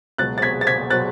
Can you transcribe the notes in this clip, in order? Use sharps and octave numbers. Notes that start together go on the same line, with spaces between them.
C#2 B2 F#3 F#6 A6
A6
G#6 B6
A6
G#6 B6
B2 F#3 F#6 A6